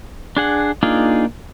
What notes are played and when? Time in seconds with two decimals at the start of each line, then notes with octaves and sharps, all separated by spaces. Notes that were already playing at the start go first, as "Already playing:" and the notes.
0.37 D4 G#4 F#5
0.83 A#3 D4 D#4 F4 G#4